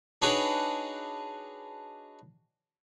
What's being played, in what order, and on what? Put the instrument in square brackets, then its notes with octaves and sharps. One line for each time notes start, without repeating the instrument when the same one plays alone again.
[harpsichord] D4 D#4 F#4 G#4 B4 C#5